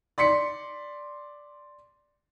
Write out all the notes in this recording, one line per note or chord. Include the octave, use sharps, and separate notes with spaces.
D5 C6 B6 C#7